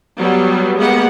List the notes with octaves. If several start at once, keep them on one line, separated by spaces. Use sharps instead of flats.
F#3 G3 B3
G#3 A#3 B3 G4 F#5